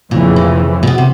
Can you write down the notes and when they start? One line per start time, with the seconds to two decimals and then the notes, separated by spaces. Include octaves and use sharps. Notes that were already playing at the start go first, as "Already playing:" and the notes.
0.11 F1 F2 A#2 C#3 E3
0.36 A#2
0.83 A#2
0.87 B2
0.98 C3